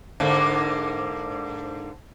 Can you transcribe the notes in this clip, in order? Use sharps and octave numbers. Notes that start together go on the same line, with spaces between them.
G#2 D3 A#3